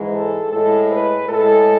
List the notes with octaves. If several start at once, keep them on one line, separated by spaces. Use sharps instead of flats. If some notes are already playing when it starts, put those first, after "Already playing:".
Already playing: G#2 E3 G#3
A4
A2 G#3 A4
B4
A2 G#3 A4